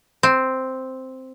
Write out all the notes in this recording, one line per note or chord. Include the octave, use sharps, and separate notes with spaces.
C4